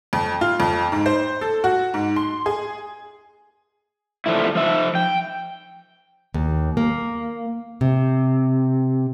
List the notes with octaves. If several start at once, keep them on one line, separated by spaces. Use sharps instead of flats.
F2
F4
F2
G#2
C5
A4
F#4
G#2
C6
G#4
D3 F3 A3 E4
F3 E5
G5
D#2
A#3
C3